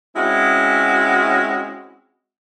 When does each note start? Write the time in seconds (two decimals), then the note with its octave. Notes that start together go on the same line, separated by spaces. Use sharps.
0.15 G#3 C4 C#4 E4 F#4